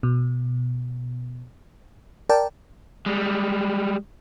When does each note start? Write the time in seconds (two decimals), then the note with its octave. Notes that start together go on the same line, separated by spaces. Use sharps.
0.03 B2
2.29 A#4 D5 G5 A5
3.06 G3 G#3